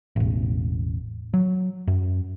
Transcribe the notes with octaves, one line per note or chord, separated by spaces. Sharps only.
E1 A1
F#3
F#2